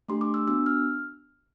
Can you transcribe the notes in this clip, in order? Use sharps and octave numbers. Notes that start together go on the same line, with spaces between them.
A3 D4 G4 C6
D6
E6
B3 D4 F#4 E6
F6